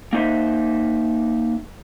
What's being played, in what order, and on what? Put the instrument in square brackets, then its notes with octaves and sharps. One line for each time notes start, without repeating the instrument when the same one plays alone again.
[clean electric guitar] A#3 D#4 C5 E5